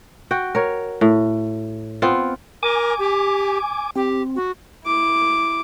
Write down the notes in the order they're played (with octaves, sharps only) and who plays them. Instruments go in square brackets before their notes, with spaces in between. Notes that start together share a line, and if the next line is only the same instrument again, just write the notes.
[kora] F#4 G5
A#4 C#5
A2
B3 C4 F4
[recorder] A#4 [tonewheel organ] G#5 D6
[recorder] G4
[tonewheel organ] C4 [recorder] G4
[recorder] F#4
[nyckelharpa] E4 D6